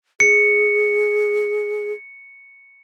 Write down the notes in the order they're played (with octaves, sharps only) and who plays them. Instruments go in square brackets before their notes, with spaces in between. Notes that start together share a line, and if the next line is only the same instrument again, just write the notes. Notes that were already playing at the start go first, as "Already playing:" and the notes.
[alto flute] G#4 [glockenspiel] C#7